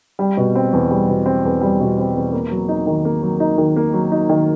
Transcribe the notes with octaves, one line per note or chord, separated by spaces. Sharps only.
G3
B2
C4
E2
G3
B2
C4
E2
G3
B2
C4
E2
A#3
F#3
D#4
D#3
A#3
F#3
D#4
D#3
A#3
F#3
D#4
D#3